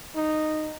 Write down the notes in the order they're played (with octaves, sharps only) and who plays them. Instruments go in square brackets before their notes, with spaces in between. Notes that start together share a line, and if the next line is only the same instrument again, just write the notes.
[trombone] D#4